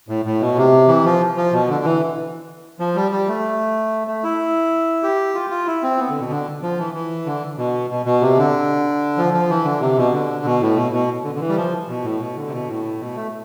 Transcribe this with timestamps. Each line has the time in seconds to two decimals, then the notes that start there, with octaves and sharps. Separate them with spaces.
0.08 A2
0.25 A2
0.41 B2
0.57 C3
0.88 E3
1.05 F3
1.37 F3
1.53 B2
1.69 D3
1.85 E3
2.80 F3
2.96 G3
3.12 G3
3.28 A3
4.07 A3
4.24 E4
5.03 G4
5.35 F4
5.50 F4
5.66 E4
5.83 C4
5.98 B3
6.09 D3
6.20 B2
6.31 D3
6.62 F3
6.78 E3
6.94 E3
7.26 D3
7.58 B2
7.90 B2
8.06 B2
8.21 C3
8.37 D3
9.18 F3
9.34 F3
9.49 E3
9.64 D3
9.81 C3
9.97 B2
10.13 D3
10.45 B2
10.61 A2
10.76 B2
10.93 B2
11.24 D3
11.35 D3
11.40 E3
11.49 G3
11.56 F3
11.89 B2
12.04 A2
12.20 B2
12.36 D3
12.47 C3
12.52 B2
12.68 A2
12.99 B2
13.16 A3